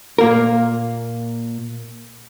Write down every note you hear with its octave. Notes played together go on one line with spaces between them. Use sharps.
A#2 A#3 A#4